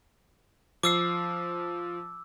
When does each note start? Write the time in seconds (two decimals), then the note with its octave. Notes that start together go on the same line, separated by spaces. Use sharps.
0.83 F3 D6 E6 C7